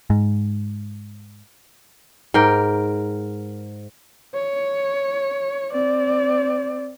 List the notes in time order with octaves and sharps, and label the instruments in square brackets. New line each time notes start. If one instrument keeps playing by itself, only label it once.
[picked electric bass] G#2
[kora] G#2 A#4 G5
[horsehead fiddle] C#5
C4 D5